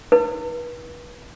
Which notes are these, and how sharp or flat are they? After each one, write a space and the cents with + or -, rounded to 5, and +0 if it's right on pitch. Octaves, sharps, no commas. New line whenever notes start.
D#4 +45 B4 -35